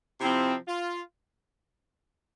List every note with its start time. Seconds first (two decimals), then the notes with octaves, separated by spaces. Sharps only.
0.20 C3 F3 C4 E4 F4
0.68 F4